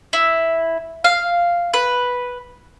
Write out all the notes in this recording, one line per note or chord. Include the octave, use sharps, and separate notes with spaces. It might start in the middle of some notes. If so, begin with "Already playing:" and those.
E4
F5
B4